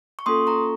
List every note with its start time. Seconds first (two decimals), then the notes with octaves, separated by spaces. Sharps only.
0.19 C#6
0.26 A#3 C#4 F4 A4 C6 D#6
0.47 A#5 C#6